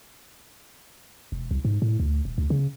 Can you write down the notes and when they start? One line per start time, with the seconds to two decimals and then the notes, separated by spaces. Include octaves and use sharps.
1.32 E1
1.51 C2
1.65 G#2
1.82 A2
2.00 D2
2.25 D#1
2.38 D2
2.50 C#3